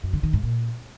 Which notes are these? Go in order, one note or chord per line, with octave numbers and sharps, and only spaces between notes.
F#2
D3
D#3
G#2
A#2